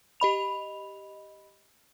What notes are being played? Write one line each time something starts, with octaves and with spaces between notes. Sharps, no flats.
G4 D#5 B5 F7